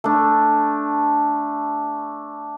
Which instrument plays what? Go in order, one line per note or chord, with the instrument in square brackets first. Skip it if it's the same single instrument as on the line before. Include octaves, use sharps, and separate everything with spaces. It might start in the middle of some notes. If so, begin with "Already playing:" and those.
[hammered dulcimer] A3 D4